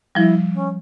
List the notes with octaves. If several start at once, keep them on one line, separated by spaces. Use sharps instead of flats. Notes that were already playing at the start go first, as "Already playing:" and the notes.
F3 G3 E4
C#4